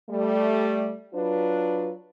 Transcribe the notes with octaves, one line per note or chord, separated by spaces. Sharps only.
G3 A3
F#3 D4 F4 B4